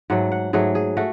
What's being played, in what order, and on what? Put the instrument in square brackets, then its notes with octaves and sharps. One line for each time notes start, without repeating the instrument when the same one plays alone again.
[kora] G#2 F#3 A3 F#5
F#5
G#2 F#3 A3 G#4
G#4
A3 F#4